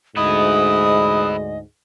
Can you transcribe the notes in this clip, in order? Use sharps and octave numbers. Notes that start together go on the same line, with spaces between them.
D2 G#2 B3 E4 D#5 D#6